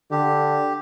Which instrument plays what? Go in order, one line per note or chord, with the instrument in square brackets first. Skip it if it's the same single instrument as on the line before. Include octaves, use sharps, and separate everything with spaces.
[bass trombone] D3 [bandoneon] G4